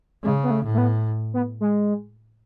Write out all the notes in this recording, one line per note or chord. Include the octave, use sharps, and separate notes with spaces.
C#3 G#3
B3
A3
A2
A3
B3
B3
G#3